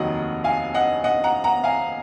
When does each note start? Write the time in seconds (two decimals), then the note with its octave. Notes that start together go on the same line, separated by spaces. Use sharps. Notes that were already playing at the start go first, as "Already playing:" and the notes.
Already playing: F1 D#2 D#3 F#3 D#5 F#5
0.44 F5 G#5
0.74 D#5 F#5
1.04 D#5 F#5
1.24 F#5 A#5
1.44 F#5 A#5
1.64 F5 G#5